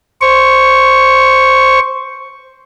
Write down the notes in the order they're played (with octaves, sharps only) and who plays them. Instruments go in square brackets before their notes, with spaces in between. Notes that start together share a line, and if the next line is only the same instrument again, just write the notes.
[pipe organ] C5 C#6